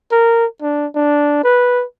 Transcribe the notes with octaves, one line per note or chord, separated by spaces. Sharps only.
A#4
D4
D4
B4